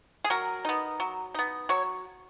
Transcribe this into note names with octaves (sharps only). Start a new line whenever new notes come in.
G#4
F#3 A#4
B3 D#4
F#3
B3 D#4
F#3 C#5